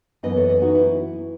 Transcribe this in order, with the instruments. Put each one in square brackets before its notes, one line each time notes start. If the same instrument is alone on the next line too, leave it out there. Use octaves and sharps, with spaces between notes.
[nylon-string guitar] F#2 E3 B3 B4 D#5
A4 C#5
B4 D#5
D#4 F#4
E4